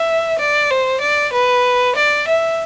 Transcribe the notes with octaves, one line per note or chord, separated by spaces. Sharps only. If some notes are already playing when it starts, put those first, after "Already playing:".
Already playing: E5
D5
C5
D5
B4
D5
E5